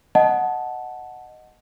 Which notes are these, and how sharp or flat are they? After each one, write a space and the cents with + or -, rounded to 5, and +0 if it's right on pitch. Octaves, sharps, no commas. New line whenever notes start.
D#5 +0 F#5 +0 A5 -10